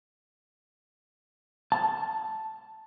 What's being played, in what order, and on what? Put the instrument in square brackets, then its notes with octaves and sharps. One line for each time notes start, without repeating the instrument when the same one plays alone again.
[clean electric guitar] A5